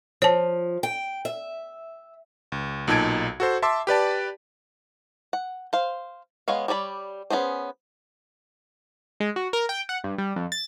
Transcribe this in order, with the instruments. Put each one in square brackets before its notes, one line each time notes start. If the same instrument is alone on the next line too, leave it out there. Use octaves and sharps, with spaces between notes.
[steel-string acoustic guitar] F3 [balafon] C#5 A5
[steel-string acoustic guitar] G5
E5
[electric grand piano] C#2
B1 A#2 D#4 A5 G#6 D7
F#4 A4 C5
E5 A5 C6 D6 E6
G4 B4 D5 A5
[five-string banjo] F#5
C5 F5
G#3 B3 C#5 F5
G3 C#5 D5 B5
B3 C#4 G#4 C5
[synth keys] G#3
F#4
A#4
G5
F#5
G2
G3
F2
A6